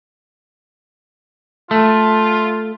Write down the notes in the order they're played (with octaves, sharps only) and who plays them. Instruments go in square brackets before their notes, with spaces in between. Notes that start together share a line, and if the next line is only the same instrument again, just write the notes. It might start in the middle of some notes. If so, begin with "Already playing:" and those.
[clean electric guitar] A3 [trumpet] F4